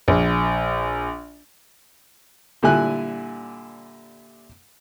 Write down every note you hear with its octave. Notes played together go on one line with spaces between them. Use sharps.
A#1
A#2 D3 G3 E4 G#5 F#6